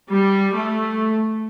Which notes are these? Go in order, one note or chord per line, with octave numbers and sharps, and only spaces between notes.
G3
A3